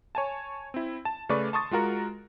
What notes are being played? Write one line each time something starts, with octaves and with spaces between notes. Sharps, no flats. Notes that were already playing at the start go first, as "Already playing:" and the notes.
C#5 G#5 A5
C4 E4
A5
C#3 A3 B4 D5 C#6
A5 C6 C#6 D#6 A6
G#3 F4 F#4 A#4 F#5